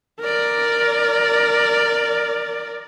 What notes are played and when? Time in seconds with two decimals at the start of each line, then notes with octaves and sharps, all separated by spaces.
0.21 A#4 D5